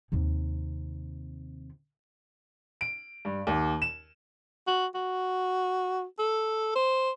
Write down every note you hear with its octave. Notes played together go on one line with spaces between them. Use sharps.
D#2 C3
D7
G2
D#2
E7
F#4
F#4
A4
C5